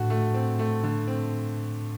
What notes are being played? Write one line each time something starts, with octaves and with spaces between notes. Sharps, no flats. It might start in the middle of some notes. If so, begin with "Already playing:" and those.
Already playing: A2 D3 A3 F#4
A3
C4
A3
D3
C4